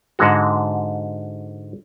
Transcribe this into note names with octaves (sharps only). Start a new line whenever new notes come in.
G#2 D3 G#3 F#4